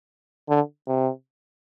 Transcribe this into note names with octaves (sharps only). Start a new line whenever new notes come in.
D3
C3